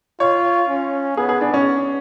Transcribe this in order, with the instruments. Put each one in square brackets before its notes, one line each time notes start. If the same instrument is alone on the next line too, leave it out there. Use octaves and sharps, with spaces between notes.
[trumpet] F4 [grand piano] C#5
[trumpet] C#4
[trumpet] B3 [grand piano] G#4
[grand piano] G#4
D4
C#4